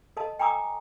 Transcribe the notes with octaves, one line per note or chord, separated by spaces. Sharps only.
A4 D#5 A5
G5 G#5 A#5 D6 D#6